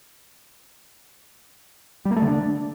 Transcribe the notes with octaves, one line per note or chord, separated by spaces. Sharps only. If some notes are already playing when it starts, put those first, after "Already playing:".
G3
A#3
A3
D3
D4